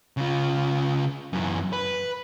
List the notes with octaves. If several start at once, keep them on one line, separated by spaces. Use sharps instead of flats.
C#3 F4
F#2 E3
B4